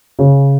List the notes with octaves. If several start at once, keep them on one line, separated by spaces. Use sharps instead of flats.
C#3 C#4